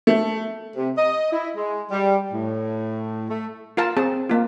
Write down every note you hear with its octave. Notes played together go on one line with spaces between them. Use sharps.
A3
C3
D#5
E4
G#3
G3
A2
A3
F4 A#4 F5 A5
C4 G#4 A5
A#3 F4